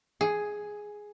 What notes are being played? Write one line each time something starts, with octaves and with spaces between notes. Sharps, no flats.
G#4